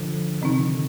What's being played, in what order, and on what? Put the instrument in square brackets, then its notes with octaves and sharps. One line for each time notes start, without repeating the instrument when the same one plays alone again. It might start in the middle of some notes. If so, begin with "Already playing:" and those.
Already playing: [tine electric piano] D3 F3
[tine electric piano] C3 D#3 [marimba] F3 C4 D#4
[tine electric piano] D3